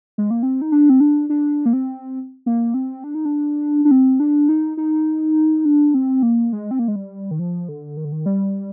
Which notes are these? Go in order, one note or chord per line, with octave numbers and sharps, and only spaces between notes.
G#3
A#3
C4
D#4
D4
C4
D4
D4
A#3
C4
A#3
C4
D4
D#4
D4
D4
C4
D4
D#4
D#4
D4
C4
A#3
G#3
C4
A#3
G#3
G3
D#3
F3
D3
D#3
D3
D#3
G3